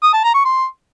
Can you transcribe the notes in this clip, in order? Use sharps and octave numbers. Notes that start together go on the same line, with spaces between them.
D#6
A5
A#5
C#6
C6